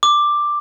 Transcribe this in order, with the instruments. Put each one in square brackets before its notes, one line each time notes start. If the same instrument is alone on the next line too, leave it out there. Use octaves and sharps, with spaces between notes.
[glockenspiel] D6